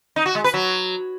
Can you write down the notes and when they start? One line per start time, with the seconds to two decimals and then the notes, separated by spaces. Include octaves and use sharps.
0.16 D#4
0.26 F#4
0.35 G#3
0.44 B4
0.54 F#3